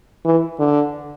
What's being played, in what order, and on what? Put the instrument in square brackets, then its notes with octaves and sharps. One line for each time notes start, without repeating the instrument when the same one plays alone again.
[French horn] E3
D3